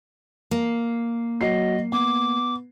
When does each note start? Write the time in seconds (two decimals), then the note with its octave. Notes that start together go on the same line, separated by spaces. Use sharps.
0.51 A#3
1.41 F#3 D#5 C7
1.92 B3 D6